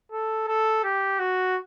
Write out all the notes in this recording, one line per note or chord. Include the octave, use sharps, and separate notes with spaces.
A4
A4
G4
F#4